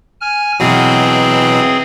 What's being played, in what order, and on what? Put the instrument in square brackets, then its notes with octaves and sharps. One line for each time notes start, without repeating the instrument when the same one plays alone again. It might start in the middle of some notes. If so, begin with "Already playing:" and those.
[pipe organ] G#5 F6
[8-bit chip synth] B2 E3 F#3 [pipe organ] C4 G#4